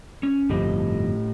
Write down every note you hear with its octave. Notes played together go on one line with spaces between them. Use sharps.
C#4
G1 F2 A2 F3 G4 D#5